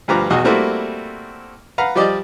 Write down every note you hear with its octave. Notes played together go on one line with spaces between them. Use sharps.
D2 G2 F3 B4 A#5 D6
B1 E2 F#4 D#5
G3 A3 A#3 C4 E4 F#4
B4 F5 F#5 A#5
F3 G3 G4 D5 D#5